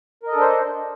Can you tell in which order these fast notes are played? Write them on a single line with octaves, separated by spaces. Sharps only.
A#4 D#5 A4 D4 C5